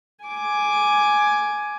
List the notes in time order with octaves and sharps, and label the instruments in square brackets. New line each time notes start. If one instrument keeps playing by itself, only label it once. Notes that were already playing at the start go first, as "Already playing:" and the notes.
[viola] G#5 D6